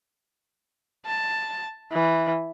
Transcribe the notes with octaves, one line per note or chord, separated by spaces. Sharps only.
A5
E3